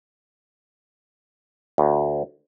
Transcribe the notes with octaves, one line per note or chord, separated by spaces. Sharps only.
D2